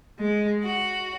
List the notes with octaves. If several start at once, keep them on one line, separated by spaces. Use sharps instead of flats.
G#3
F#4